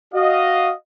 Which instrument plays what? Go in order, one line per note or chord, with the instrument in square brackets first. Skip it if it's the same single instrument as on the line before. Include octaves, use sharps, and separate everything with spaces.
[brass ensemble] F#4 D#5 F5